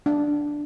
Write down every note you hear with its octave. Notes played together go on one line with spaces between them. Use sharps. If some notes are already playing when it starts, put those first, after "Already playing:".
D4